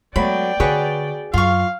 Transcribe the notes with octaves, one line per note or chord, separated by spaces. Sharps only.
F#3 G#3 A3 B3 D5 G5 B5
D3 F#4 G#4 B4 C#5
F#2 F4 F5 C#6